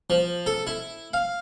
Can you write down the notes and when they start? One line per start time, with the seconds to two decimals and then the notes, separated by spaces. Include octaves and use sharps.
0.10 F3
0.46 A4
0.67 E4
1.14 F5